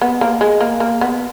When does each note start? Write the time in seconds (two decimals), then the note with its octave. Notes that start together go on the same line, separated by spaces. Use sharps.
0.01 B3
0.21 A#3
0.41 G#3
0.60 A#3
0.80 A#3
1.01 B3